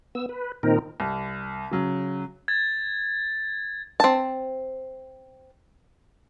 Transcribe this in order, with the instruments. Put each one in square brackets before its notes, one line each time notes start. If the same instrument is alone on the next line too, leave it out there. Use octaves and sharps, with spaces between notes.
[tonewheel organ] B3 E6
B4
A#2 D#3 C4 D#4 A#4
[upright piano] C2
C#3 F#3
[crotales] G#6 A6
[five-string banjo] C4 A5